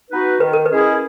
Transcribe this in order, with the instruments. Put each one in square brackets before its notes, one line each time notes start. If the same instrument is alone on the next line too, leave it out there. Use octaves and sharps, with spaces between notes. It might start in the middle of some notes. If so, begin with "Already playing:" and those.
[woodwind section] B3 D#4 F#4 B4
[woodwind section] D#3 [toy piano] B4
[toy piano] A#4
B4
[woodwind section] G#3 C#4 E4 G#4